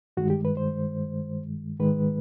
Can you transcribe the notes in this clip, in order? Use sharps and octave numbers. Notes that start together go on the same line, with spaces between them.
G2 D#3 G#3 F#4
G4
B4
C5
G#2 D#3 G#3 B4